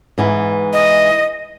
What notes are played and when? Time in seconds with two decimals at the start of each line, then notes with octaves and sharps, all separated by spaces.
0.18 G#2 E3 B3
0.73 D#5